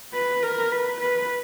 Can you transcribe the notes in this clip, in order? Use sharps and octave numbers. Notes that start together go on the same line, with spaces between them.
B4
A#4
B4
B4